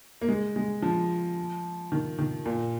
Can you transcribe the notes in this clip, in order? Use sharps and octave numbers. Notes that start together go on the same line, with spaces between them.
A#3
G#3
G#3
F3
D#3
D#3
A#2